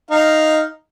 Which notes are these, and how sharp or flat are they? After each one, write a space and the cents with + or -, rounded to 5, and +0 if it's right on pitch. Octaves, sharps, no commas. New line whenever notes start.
D#4 +0 F5 +0